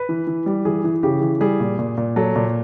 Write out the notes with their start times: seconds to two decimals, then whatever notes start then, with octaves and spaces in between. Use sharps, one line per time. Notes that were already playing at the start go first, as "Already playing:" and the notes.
Already playing: B4
0.09 E3
0.27 E3
0.46 G3
0.65 E3 G#4
0.84 E3
1.03 C#3 G4
1.21 E3
1.41 G3 G#4
1.60 A#2
1.79 A#2
1.98 A#2
2.16 F#3 A4
2.36 A#2